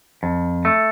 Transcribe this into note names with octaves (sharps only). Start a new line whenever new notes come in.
F2
A3